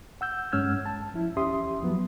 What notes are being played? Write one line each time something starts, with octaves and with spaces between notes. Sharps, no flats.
F#5 E6 G6
G2 G#3 C#4 E6 F6 G#6
A5
F3 E4
E2 C#4 G4 E5 C6 D#6
F3 F#3 B3